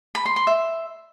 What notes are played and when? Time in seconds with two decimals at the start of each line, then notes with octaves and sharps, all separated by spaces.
0.15 B5
0.26 C6
0.36 C6
0.47 E5